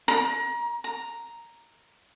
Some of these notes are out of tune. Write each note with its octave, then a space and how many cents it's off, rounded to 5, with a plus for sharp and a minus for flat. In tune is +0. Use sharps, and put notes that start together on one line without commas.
A#5 +30
A#5 +0